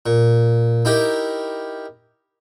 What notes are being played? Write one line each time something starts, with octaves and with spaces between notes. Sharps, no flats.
A#2
D#4 E4 G4 A#4